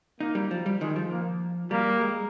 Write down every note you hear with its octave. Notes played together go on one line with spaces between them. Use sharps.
A#3 D#4
G3
F3
G3
D#3 G#3
F3
A#3
G3 A#3
G#3